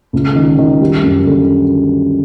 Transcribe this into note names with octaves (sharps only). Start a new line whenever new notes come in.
C#2
D#3
D#3
G3
F#2
D3